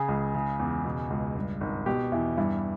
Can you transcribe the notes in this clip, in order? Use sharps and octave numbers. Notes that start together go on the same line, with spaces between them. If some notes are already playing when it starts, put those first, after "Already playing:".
Already playing: C#3 G#4
C#2
C#3
E2
B2
C#2
G2
G#1
B2 G4
E2 E4
G2 E4